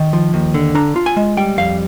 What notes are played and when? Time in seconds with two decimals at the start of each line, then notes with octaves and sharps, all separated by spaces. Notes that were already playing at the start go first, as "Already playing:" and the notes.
Already playing: D#3
0.13 F3
0.34 D#2
0.54 D3
0.75 D4 A#5
0.96 F4
1.06 G#5
1.16 G#3
1.37 G3 G5
1.58 F2 F5